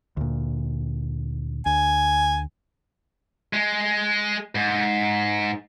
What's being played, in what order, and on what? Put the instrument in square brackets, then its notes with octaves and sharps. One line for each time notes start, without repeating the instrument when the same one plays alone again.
[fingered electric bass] D2 A#2
[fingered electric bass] D2 [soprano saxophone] G#5
[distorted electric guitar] G#3
G#2